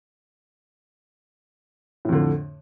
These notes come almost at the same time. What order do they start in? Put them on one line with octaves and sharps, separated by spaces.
A2 F2 D3